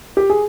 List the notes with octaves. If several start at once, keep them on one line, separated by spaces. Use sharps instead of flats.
G4
G#4